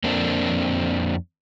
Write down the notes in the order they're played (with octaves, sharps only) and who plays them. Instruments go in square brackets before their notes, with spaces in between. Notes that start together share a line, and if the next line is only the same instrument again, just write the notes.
[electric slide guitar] F2 A#3 C4 D4